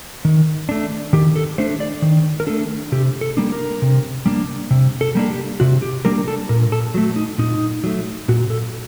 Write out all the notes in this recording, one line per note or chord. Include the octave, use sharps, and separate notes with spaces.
D#3
A3 D4
D#3 G4
A4
A3 D4 C5
D5
D#3
A#4
A3 D4 A4
C3 G4
A4
G3 A#3 D4
A#4
C3
G3 A#3 D4
C3
A4
G3 A#3 D4
G4
C3 F#4
G4
G3 A#3 D4 A#4
A4
A#2 A#4
A4
F#3 A3
D#4
A#2 D#4
F#3 A3
A#2 F#4
A4